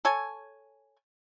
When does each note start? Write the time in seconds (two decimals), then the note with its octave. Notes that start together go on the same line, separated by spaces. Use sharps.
0.05 A4 C#5 G#5